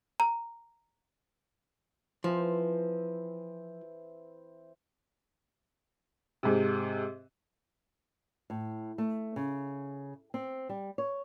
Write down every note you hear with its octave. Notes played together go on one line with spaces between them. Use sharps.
A#5
E3 F3 C4
G#2 C3
A2
A3
C#3
C4
G3
C#5